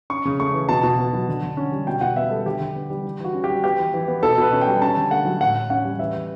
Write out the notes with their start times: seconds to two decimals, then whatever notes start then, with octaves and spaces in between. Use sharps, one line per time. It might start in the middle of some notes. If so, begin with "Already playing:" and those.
0.10 C#4 C#6
0.25 C#3
0.40 A3 C#6
0.54 E3
0.69 B2 A5
0.83 B2
0.98 B3
1.13 F#3
1.28 D3
1.43 D3
1.57 C#4
1.72 G3
1.87 B2 G5
2.01 B2 F#5
2.16 B3 E5
2.31 G3 A4
2.46 D3 G4
2.61 D3
2.75 B3
2.90 G3
3.05 E3
3.20 E3 F#4
3.34 C#4
3.44 G3 G4
3.64 B3 G4
3.79 E3
3.94 E3
4.08 B3
4.23 B2 A4
4.38 B2 B4
4.52 C#4
4.61 G5
4.67 G3
4.81 C#4 A5
4.97 D3
5.11 A3 F#5
5.25 F#3
5.40 A2 F#5
5.55 A2
5.70 C#4 F#5
5.84 G3
5.99 E3 E5
6.14 E3